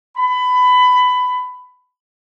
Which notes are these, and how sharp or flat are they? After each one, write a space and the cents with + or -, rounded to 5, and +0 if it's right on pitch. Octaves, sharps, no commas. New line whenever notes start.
B5 +20